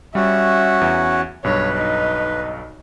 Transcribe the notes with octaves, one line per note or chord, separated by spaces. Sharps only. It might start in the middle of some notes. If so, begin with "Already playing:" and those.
G3 C#4 F#4 E5 F#5
E2
B1 G2 B4 C#5
D#4